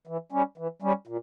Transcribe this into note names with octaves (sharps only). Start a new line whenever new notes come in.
E3
G3 C#4
E3
G3 C#4
A#2